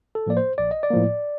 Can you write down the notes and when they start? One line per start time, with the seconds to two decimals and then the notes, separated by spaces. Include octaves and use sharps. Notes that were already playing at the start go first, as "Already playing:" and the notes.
0.15 A4
0.26 A2 F3 A#3 D5
0.37 C5
0.58 A#1 D5
0.71 D#5
0.83 D5
0.91 A2 F3 A#3